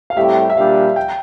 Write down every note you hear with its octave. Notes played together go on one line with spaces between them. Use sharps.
F5
A2 G3 C4 G4 E5
E5
A#2 G3 D4 G4 F5
G5